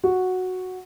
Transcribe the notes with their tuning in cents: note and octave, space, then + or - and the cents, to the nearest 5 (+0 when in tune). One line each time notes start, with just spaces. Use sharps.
F#4 -5